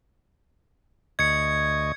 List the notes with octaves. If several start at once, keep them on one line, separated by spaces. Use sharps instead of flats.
D2 D#5 C#6 G#6 C#7